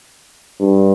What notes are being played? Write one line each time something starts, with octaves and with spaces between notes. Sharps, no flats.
G2